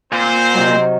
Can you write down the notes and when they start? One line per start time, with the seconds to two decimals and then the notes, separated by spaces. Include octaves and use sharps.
0.12 A#2 C4 C5
0.54 C3 D#3 F#3